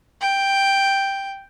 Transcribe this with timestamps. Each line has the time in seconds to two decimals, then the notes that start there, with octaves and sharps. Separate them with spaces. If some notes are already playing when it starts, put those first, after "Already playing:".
0.21 G5